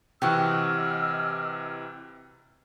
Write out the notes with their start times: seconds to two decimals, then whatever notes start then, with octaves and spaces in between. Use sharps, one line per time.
0.22 C3 E3 F#4 G4 D#5 E6 F6